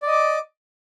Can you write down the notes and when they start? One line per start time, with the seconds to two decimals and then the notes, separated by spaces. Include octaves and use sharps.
0.02 D5
0.07 D#5
0.12 D6